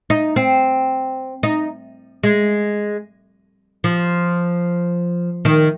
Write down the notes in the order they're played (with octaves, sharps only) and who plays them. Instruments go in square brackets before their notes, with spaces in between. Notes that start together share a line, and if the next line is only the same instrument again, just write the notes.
[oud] D#4
C4
D#4
G#3
F3
D#3